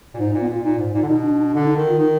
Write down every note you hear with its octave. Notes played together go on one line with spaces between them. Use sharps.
A#2
G#2 D#4
D#4
A#2
B3
A#2 F4
A#2 D#4
G#2
A#2 D#4
D3
B2 D#4
D4
D4
D3 D4
D#4
D#3
F4
D#3 D#4